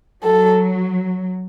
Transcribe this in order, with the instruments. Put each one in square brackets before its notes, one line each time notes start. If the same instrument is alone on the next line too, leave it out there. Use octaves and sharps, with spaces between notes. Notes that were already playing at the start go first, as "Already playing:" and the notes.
[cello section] F#3 [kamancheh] A4